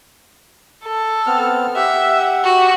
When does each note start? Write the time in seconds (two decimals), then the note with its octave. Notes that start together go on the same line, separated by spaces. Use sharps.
0.83 A4
1.27 B3 C4 F6
1.76 G4 E5 F#5
2.44 F#4